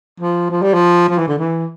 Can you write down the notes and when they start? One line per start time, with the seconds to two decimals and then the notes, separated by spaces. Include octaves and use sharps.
0.20 F3
0.50 F3
0.62 G3
0.74 F3
1.09 F3
1.18 E3
1.28 D3
1.38 E3